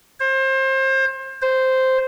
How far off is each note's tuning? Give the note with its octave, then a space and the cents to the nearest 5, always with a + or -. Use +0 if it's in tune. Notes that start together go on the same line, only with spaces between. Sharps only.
C5 +30
C5 -5